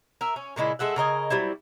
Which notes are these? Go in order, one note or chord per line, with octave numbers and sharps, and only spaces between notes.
A#4 E5
C#4
A#2 C#3 G#3 E4
G#3 A3 E5 F#5
C#3 A#4 D#5 G#5
F#3 G3 C4 E4